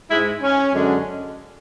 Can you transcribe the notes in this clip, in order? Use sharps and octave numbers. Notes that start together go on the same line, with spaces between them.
G#2 G#3 E4
C#4
F#2 D3 G#3